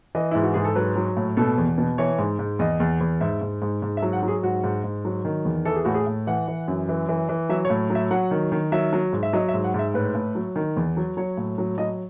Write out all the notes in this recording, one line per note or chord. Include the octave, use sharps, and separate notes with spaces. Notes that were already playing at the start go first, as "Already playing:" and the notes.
E3 D#5
G#2 E4
F#4
G#2 G#4
A4
F#3 B4
F#3
A2
B2 A4
E2
B2
E3 C#5
G#2
G#2
E2 D#5
E2
E2
G#2 E5
G#2
G#2
G#2
E5
F#3
F#5
F#3
G#4
G#2 F#4
G#2
G#2
F#3
D#3
E2
E3 A4
G#4
A2 F#4
G#4
A2
E3 F#5
E3
F#2
E3
E3
E3
F#3 E5
C#5
A2
F#3
E5
F#3 F#5
D#3
D#3
F#3 E5
F#3
G#2
E5
F#3 D#5
E5
G#2
F#5
G#2 E5
A2 B4
A2
F#3
D#3
E2
F#3
F#3 C#5
A2
F#3
F#3 D#5